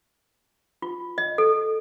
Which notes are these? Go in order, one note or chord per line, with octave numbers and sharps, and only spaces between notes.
F4
D#5
A4